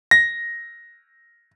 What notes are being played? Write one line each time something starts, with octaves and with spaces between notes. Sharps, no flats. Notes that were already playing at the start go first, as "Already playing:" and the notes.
A#6